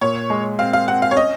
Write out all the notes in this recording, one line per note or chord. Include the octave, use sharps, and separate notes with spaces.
A#2 C#5
G#3
C4 F5
F5
C4 F#5
F5
C#5
C#4 D#5